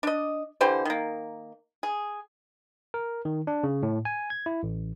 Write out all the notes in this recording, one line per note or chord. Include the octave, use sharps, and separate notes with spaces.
D4 D#5
D3 E3 G4 C5
D#3 A#3
G#4
A#4
D#3
D4
C#3
A2
G#5
G#6
E4
A1